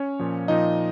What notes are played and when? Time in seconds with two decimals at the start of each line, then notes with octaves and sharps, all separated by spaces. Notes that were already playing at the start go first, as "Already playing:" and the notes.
Already playing: C#4 C#5
0.19 A#2 F3
0.48 A#2 F3 D#4 D#5